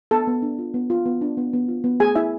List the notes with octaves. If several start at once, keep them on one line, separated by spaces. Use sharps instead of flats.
B3 A4 A5
B3
D4
F4
B3
F4
B3
D4
B3
B3
F4
B3
A3 G#4 G#5
E4 E5